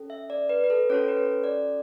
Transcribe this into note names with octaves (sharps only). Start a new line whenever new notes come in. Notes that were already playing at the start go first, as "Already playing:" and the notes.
Already playing: C#4 A4
E5
D5
B4
B4
A4
C#4 F#4 A4 C#5
B4
C#5
D5